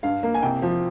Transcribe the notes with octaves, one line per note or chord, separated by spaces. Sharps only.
G2 F5
A#3
G#5
C2 G5
F3